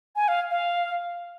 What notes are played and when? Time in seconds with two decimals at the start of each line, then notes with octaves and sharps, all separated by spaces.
0.16 G#5
0.28 F5
0.51 F5